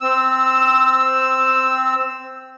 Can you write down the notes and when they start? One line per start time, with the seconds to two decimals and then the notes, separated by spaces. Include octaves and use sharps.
0.01 C4 E6